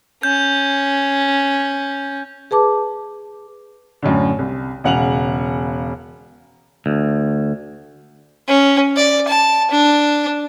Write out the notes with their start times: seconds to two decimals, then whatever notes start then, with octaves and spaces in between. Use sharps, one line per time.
0.23 C#4 G6
2.51 G#4 B4 A5 D6
4.03 F#2 A2 D3
4.39 C2
4.84 E1 C#3 F#5 G#5 F7 F#7
6.86 D2
8.48 C#4
8.96 D5
9.28 A5
9.71 D4